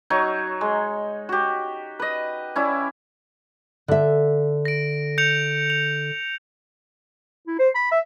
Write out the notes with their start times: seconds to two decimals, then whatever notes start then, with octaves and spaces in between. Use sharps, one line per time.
0.10 F#3 D#4 C#5
0.61 G#3
1.29 F#4 G4
1.99 B4 D#5
2.56 C#4 E4 D5
3.88 D3 E5
4.65 A#6 D7
5.18 G6 C#7 F7
5.70 F7
7.47 E4
7.59 C5
7.75 B5
7.91 E5